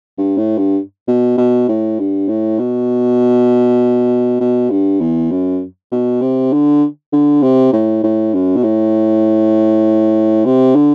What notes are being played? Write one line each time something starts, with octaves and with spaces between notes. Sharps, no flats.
G2
A2
G2
B2
B2
A2
G2
A2
B2
B2
G2
E2
F#2
B2
C3
D3
D3
C3
A2
A2
F#2
B2
A2
C3
D3